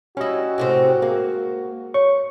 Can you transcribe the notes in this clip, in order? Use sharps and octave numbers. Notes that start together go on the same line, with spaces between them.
G3 C#4 E4 F#4 D#5
A2 C3 C4
G#3 A#3
C#5 C#6